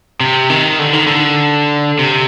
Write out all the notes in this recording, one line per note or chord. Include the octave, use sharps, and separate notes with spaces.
C3
D#3
D3
D#3
D3
C3